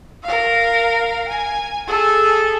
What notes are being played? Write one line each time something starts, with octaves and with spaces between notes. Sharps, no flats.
A#4 F5
G#5
G#4 A4